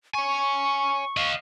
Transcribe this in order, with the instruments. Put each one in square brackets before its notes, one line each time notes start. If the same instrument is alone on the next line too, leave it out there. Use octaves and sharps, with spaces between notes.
[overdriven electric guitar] C#5 G#5 [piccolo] C#6
[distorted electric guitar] D#5 F5